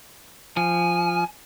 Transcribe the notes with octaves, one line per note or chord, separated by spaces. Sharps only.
F3 G#5